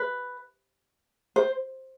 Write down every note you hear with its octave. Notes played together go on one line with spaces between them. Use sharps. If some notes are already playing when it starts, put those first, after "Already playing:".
Already playing: B4
C5